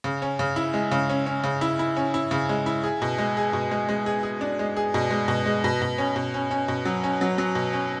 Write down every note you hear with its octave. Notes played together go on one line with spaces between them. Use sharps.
C#3
C#4
C#3
E4
G#3
C#3
C#4
C#4
C#3
E4
E4
C#4
E4
C#3
G#3
E4
G#4
B2
G#3
G#4
B2
G#3
G#3
G#4
G#4
D4
G#3
G#4
B2
G#3
B2
G#3
B2
B2
C#4
B2
C#4
C#4
B2
F#3
C#4
F#3
F#3
B2
C#4